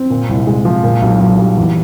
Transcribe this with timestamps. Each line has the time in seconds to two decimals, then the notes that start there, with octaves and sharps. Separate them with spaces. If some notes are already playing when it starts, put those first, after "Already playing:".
Already playing: C4
0.10 A#2
0.29 C2
0.47 G#3
0.65 F3
0.84 A#2
1.02 B1
1.21 B1
1.39 G3
1.57 E2